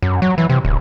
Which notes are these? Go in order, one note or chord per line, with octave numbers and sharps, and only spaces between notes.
F#2
F#3
E3
C3
D1